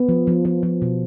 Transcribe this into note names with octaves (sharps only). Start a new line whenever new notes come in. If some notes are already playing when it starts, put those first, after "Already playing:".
Already playing: B3
F3
F3
F3
F3
B2